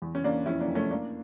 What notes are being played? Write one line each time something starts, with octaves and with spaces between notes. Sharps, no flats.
E2
C#4
E2 A#3 D4
F2 C#4 E4
A#3 D4
F2
A3 C#4
E3 A#3 D4